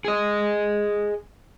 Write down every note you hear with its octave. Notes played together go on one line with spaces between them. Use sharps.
G#4 D#5